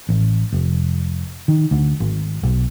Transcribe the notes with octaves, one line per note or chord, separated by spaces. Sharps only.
A1
F1
D#3
D2
G#1
B1